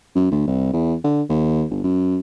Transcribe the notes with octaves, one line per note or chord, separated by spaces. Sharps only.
F#2
D2
C2
E2
D3
D#2
G1
F#2